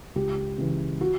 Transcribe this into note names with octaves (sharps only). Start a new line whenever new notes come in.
C#2 G4
C#3 E3
F#4